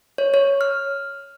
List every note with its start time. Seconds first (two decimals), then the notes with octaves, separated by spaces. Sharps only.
0.18 C#5
0.34 C#5
0.61 F6